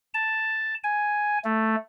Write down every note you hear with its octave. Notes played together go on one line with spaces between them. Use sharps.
A5
G#5
A3